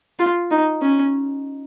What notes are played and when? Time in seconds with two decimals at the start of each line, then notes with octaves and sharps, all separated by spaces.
0.19 F4
0.51 D#4
0.82 C#4